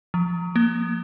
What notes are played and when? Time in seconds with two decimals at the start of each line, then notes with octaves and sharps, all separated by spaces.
0.14 F3
0.56 A#3